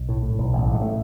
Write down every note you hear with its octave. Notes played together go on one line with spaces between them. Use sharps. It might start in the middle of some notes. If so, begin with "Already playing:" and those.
Already playing: B1
A2
A2
B1
A1
A2
G#3
A3